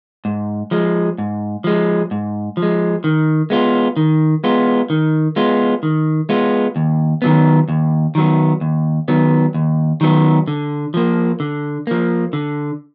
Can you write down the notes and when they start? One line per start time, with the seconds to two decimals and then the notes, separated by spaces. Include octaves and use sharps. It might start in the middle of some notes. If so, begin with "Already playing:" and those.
0.25 G#2
0.71 F3 G#3
1.18 G#2
1.64 F3 G#3
2.11 G#2
2.57 F3
2.62 G#3
3.04 D#3
3.50 G#3 B3 F4
3.97 D#3
4.44 G#3 B3 F4
4.90 D#3
5.36 G#3 B3 F4
5.83 D#3
6.29 G#3 B3 F4
6.76 D#2
7.22 D#3 F#3 B3
7.69 D#2
8.15 D#3 F#3 B3
8.61 D#2
9.08 D#3 F#3 B3
9.54 D#2
10.01 D#3 F#3 B3
10.47 D3
10.94 F3 A#3
11.40 D3
11.87 F3 A#3
12.33 D3